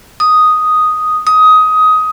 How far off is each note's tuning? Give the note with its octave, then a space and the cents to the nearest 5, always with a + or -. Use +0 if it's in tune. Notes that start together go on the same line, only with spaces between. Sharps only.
D#6 +0
D#6 +15